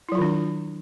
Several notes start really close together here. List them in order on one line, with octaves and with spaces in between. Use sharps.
E4 F#3 F4 D#3 D4